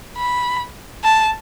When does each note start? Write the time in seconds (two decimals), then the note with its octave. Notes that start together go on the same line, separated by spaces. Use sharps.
0.17 B5
1.03 A5